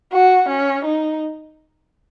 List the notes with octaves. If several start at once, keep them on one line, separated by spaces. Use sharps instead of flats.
F#4
C#4
D#4